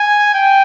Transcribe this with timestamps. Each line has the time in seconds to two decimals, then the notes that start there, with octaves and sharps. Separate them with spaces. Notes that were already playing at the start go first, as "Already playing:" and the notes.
Already playing: G#5
0.34 G5